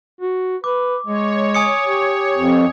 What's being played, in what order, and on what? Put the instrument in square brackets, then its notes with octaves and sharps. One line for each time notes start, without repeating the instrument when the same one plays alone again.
[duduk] F#4
[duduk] B4 [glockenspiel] D6
[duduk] G#3 [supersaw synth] C#5
[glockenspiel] G#5 D#6 C#7
[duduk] G4
[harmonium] F2